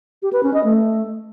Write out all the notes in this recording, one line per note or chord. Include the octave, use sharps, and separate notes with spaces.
G4
B4
C#4
D#5
A3